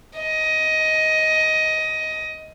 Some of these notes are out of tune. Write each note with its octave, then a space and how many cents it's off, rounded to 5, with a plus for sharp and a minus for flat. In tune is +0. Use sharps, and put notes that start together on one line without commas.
D#5 +15